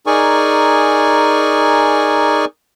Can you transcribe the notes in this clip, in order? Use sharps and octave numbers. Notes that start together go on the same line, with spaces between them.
D#4 G#4 A#4 D5 G#5 C#6